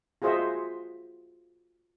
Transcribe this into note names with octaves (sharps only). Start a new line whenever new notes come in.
F4 F#4 G#4 C5 D#5 E5